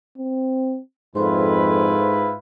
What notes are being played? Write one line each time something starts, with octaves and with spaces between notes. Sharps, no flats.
C4
F2 G#2 E4 F4 A4 B4 C5 C6